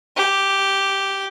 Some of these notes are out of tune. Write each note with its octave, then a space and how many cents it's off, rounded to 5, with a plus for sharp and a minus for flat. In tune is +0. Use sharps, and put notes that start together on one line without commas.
G4 -5